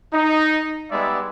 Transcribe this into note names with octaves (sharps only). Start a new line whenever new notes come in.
D#4
G3 G#3 B3 D#4 D5 E5